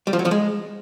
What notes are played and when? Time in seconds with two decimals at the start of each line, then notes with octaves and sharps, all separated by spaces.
0.07 G3
0.13 F3
0.19 F#3
0.25 F3
0.31 G#3